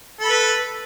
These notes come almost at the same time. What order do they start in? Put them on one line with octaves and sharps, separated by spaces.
A4 B5 B4